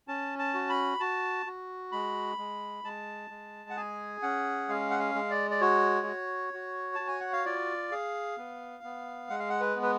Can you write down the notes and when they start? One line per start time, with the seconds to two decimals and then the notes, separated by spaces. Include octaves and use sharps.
0.08 C#4 A5
0.39 A5
0.54 F#4
0.69 B5
1.00 F#4 A5
1.46 F#4
1.92 G#3 B5
2.38 G#3
2.84 G#3 A5
3.30 G#3
3.70 F#5
3.77 G#4 G#5
4.22 C#4 F#5
4.69 G#3 F5
4.91 F#5
4.99 F5
5.15 G#3
5.30 D5
5.51 D5
5.61 F#4 C#5
6.07 F#4
6.54 F#4
6.95 F#4 A5
7.08 G#5
7.20 F#5
7.33 F5
7.45 F4 D5
7.91 G#4 F5
8.38 B3
8.84 B3
9.30 G#3 F#5
9.39 F5
9.49 F#5
9.60 B4
9.76 B3
9.83 B4